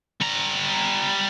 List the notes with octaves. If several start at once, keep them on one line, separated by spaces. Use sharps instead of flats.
G3 A#5